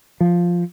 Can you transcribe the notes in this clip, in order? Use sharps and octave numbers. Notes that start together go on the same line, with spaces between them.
F3